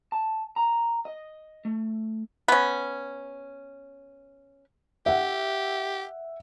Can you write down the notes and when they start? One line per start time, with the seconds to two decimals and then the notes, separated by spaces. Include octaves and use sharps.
0.12 A5
0.56 A#5
1.05 D#5
1.65 A3
2.48 B3 C#4
5.06 G4 E5 F#5